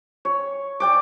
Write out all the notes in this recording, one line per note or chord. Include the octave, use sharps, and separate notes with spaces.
C#5
D5 G5 D6